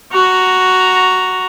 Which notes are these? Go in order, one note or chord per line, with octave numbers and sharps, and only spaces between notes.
F#4 A#5